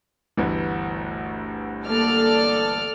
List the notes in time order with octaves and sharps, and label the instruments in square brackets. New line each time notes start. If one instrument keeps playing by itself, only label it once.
[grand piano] G1 D2 E3
[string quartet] A#3 [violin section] A4 D5 F6